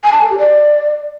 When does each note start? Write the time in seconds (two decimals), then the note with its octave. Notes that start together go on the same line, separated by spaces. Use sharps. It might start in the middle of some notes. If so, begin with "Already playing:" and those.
0.04 G#5
0.12 A5
0.21 A4
0.30 G4
0.38 D5